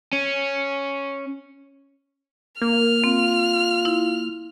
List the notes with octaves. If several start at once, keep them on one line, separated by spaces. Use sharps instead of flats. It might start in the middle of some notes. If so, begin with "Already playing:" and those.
C#4
A#3 F6
C4 F4
E4